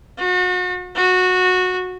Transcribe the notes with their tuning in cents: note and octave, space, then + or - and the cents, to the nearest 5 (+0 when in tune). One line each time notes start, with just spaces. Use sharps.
F#4 -35
F#4 -15